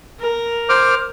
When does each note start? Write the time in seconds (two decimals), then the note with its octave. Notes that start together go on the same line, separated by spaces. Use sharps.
0.20 A#4
0.69 C5 D6 F6